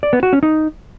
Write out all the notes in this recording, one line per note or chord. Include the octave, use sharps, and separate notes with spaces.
D5
B3
F#4
C#4
D#4